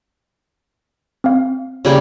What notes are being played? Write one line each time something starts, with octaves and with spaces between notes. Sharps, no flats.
C4 F5
C#3 G3 A#3